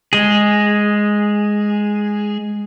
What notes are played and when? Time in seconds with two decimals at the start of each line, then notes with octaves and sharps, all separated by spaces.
0.13 G#3 G#4